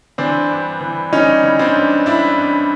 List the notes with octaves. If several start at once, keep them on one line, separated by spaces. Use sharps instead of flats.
E3 C4 D4
G2
E3
G3 C#4 D#4
E3
C4 D4
G2
G2 D4 E4
G2